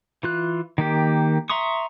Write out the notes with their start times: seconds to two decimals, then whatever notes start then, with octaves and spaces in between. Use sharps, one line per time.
0.23 E3 F4 F#6
0.78 D#3 A#3 G4
1.50 E5 A#5 C6 C#6 D#6